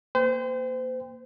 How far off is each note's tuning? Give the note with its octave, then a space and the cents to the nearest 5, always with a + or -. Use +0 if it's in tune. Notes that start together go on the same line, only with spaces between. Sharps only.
A#3 +0 C5 -35 G5 +25